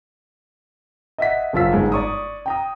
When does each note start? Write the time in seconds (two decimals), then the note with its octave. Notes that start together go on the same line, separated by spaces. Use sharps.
1.18 D#5 E5 F#5 B6
1.53 F#1 F3 F4 E6 B6
1.72 G1 G#2 G#3 D#4
1.92 D5 C#6 D#6
2.46 G5 A#5 D#6